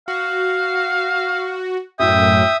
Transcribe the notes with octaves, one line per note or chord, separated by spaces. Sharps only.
F#4 F5
F#2 A2 E5 G5 D#6